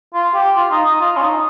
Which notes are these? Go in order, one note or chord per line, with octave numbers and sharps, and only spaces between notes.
F4
G4
F4
D#4
D#4
F4
C#4
D#4